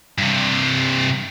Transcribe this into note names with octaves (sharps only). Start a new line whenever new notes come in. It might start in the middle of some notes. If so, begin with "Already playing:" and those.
G2 C3